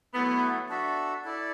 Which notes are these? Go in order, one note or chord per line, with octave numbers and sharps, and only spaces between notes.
F#3 A3 B3 E4 A4
D4 F#4 A4 E5
E4 A4 D5